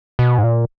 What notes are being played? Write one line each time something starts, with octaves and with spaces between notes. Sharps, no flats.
B2
G#2
A#2